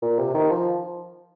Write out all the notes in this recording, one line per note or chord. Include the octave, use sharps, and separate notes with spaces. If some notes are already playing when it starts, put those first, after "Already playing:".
A#2
C3
D#3
F3